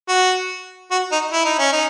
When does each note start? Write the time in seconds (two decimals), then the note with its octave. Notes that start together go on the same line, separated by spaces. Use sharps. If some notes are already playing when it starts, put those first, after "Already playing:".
0.08 F#4
0.91 F#4
1.12 D#4
1.32 E4
1.45 D#4
1.59 C#4
1.72 D#4